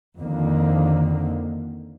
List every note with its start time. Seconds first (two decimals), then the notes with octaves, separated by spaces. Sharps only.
0.19 F2 D3 D#3 A#3